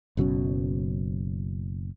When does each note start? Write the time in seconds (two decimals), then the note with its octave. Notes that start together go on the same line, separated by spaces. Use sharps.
0.17 F#1 B2 F#3 C#4